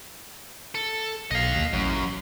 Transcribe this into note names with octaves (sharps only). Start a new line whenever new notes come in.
A4
B1 D#5 F5
D#2
A1 F#2